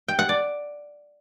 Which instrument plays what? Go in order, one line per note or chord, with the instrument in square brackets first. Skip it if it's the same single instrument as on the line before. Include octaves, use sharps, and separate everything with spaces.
[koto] G5
F#5
D5